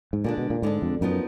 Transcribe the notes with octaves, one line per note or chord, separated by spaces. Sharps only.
G#2
A#2 D3 G#3 D4
B2
A#2
G#2 D3 G#3 D4
F2
F#2 F3 B3 D#4 A#4